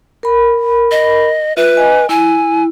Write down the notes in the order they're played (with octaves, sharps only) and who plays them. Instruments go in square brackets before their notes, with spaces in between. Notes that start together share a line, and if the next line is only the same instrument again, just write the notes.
[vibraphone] A#4 B5
[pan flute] D#5
[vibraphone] F4 E5 [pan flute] B4
[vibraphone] D#5 G#5
[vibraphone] E4 [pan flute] G#5